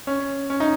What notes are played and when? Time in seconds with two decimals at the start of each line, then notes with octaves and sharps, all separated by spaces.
0.07 C#4
0.50 C#4
0.60 D#4